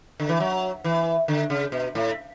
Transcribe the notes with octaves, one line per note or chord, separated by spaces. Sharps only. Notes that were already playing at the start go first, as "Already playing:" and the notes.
D3
E3
F#3
E3
D3
C#3
B2
A2